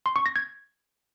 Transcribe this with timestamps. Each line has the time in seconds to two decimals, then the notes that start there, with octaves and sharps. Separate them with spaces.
0.06 C6
0.16 C#6
0.26 A#6
0.36 G#6